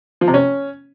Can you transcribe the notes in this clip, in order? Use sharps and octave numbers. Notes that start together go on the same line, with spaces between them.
F3
C3
C#4